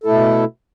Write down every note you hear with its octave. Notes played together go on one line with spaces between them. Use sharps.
B2 A3 E4 A4